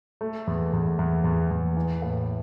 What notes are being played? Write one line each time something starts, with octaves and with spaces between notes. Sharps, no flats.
A3
E2
E2
E2
E2
E2
E3
A2